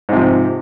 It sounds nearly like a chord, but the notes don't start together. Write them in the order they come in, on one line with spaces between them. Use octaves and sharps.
G#2 C3 F3